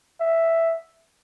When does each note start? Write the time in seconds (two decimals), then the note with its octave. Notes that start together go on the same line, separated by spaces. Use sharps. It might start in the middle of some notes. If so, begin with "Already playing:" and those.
0.21 E5